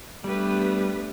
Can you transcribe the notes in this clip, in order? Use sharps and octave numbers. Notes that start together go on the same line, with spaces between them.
G3 A3 B3 D4 G4 B4